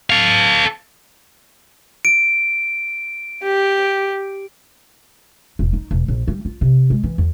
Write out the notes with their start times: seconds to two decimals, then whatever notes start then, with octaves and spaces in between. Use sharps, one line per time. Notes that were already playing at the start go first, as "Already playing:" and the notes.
0.10 A4 F5
2.05 D7
3.43 G4
5.59 E1
5.73 D#4
5.91 E1
6.08 A#1
6.28 G3
6.45 F4
6.61 C3
6.90 G#3
7.03 E3
7.18 E2